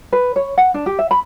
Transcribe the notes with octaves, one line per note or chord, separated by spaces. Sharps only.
B4
C#5
F#5
D4
G4
E5
B5